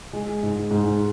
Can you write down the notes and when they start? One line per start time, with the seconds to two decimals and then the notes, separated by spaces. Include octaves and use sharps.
0.13 G#3
0.43 G#2
0.71 G#2